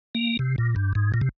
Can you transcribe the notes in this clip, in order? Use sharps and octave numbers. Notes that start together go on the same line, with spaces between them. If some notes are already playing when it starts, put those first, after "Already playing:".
A#3
C3
A#2
G2
G#2
A#2
C3